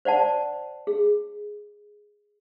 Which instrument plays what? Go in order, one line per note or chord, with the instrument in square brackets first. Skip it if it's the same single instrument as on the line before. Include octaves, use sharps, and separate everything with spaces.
[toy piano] C5 D5 F#5 A5
G#4